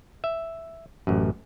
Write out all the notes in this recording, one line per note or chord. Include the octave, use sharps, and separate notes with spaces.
E5
A1 F#2